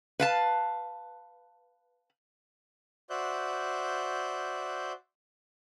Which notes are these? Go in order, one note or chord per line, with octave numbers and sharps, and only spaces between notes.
B4 F5 A5
F#4 C5 D5 E5 F#6 G6